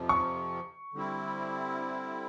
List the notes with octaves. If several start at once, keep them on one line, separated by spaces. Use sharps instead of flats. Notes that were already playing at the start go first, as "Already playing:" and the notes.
Already playing: F2 C3 F3
C#6
D3 G3 C4 E4